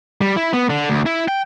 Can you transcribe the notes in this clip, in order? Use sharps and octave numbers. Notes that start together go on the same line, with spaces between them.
G3
E4
B3
D3
D2
E4
G5